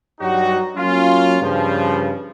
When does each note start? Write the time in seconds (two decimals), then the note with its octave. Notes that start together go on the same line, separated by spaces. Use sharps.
0.20 G2 F#3 G3 D#4 F#4
0.77 F#3 A#3 C#4 F4
1.42 G2 C#3 F3